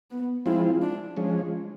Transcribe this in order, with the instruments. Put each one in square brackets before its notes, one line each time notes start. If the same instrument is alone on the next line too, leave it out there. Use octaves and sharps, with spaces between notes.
[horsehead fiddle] B3
[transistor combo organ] F3 G#3 C4 F4 [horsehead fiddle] E4
[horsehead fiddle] D4
[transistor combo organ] F3 G#3 C#4